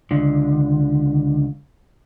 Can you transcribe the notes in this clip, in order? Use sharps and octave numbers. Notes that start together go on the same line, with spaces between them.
C#2 D3